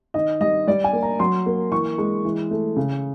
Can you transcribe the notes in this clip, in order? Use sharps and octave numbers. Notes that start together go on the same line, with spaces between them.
D#3 D#5
G3 D#5
G3 D5
G#5
A#3
A#5
F#3 C6
A#3
E3 C#6
G#3
E3
A3
C#3